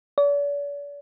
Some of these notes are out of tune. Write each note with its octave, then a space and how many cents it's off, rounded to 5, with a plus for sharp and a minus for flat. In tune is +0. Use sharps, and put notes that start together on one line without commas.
D5 -45